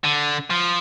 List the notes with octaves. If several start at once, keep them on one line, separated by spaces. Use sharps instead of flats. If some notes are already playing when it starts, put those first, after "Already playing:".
D3
F3